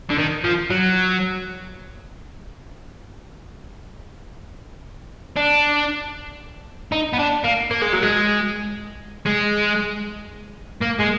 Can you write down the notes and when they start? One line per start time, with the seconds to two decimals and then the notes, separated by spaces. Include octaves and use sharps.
0.10 D3
0.18 D#3
0.44 F3
0.70 F#3
5.37 D4
6.92 D#4
7.13 B3
7.19 D4
7.44 A#3
7.71 A#3
7.82 G#3
7.93 F#3
8.02 G#3
9.26 G#3
10.81 A#3
10.99 G#3